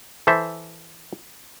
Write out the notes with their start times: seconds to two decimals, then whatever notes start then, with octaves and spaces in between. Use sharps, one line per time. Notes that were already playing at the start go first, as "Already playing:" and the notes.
0.27 E3 A4 C5 E5